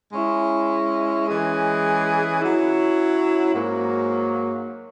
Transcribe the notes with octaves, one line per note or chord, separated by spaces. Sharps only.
G#3 C#4 E4
E3 G#3 C#4 G#4
F#3 C#4 E4
G#2 F#3 A#3